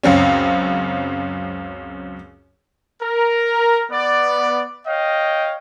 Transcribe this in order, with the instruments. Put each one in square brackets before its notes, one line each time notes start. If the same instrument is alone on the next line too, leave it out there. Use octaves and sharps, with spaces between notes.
[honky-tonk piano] C#2 F#2 C4 C#4
[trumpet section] A#4
B3 D5
C#5 D#5 F5 G5